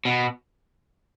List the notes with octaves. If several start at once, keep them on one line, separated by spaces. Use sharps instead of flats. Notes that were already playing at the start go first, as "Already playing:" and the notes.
B2